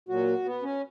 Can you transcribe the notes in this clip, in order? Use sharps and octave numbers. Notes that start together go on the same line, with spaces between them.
A#2 F#3 F#4
B3
C#4